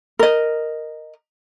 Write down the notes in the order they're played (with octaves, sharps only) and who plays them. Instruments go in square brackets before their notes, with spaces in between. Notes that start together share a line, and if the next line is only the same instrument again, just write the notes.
[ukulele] A#4 D#5